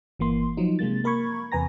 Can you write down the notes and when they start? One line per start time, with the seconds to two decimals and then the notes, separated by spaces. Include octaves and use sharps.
0.19 G1 E3 A#3 C6
0.57 F3 F#3 D#4
0.79 C3 G#3 A#3 A6
1.04 A#3 A#4 B5 C#6 G#6
1.52 E2 C3 B4 G#5 A#5 A#6